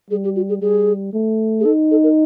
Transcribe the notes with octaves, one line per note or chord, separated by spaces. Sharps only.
G3 G#4
G4
F#4
G#4
G3 G#4
A3
G#4
D#4 A4
A4
A#4